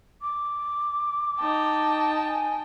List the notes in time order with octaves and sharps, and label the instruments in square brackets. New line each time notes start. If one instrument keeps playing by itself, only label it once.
[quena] D6
[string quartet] D#4 G5 A5
[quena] G#5